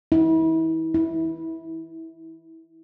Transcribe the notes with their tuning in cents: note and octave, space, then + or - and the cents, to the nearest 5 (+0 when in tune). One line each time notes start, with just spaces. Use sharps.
E4 -35
E4 -15